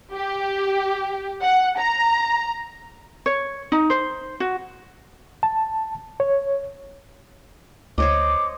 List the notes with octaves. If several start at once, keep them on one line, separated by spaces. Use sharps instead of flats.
G4
F#5
A#5
C#5
D#4
C5
F#4
A5
C#5
D2 C5 C#5 D#5 D6